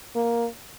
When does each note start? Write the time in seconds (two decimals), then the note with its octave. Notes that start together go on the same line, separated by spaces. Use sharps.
0.15 A#3